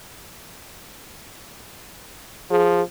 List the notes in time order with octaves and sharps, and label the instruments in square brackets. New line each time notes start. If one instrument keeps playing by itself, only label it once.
[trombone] F3 [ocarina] G#4